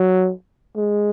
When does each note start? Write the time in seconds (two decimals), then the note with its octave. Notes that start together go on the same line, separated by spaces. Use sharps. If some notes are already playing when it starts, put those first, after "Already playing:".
Already playing: F#3
0.76 G#3